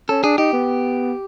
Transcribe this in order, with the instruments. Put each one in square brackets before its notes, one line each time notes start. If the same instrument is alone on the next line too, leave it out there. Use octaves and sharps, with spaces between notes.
[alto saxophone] C#4 [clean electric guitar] A4
[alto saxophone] D4 [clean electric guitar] G#4
[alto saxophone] D#4 [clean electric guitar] G4
[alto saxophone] B3